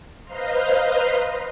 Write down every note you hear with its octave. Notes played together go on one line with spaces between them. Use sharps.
B4 C5 D#5 F5 A#5 C6